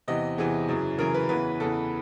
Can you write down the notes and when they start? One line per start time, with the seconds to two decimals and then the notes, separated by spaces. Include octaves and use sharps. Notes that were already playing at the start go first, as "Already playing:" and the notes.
0.08 E2 C3 E3 D#5
0.38 E2 C3 E3 G#4
0.68 F#2 C#3 E3
0.98 F#2 C#3 E3 A#4
1.14 B4
1.29 E2 C#3 E3 B4
1.60 E2 C#3 E3 A4